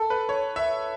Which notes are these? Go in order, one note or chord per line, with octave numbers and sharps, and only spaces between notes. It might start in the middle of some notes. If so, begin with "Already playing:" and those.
Already playing: A4
B4
C#5
E5